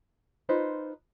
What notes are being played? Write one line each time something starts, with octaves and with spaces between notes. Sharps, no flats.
D#4 F4 B4 C5